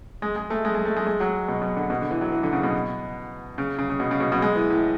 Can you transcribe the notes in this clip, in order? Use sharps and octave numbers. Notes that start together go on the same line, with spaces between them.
G#3
G#3
A3
G#3
G#3
A3
G#3
G#3
F#3
B2
B2
D3
B2
D3
E3
F#3
E3
D3
C#3
B2
C#3
C#3
C#3
B2
C#3
B2
B2
G#3
E3
A2